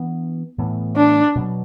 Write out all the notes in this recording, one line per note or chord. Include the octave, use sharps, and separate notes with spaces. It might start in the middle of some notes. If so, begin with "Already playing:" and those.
Already playing: E3 B3 D4
A2 E3 B3
D4
B2 F#3 B3